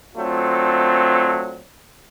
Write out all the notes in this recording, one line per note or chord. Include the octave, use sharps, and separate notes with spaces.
F#3 A3 C4 D4 F4